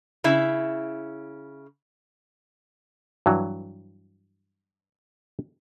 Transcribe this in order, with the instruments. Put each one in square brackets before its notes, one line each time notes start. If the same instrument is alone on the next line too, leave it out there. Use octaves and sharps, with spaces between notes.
[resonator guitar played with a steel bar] C#3 E4 E5
[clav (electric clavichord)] G2 E3 F#3